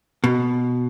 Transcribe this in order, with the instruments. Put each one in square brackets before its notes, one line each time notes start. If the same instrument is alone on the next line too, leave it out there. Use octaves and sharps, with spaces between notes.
[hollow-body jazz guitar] B2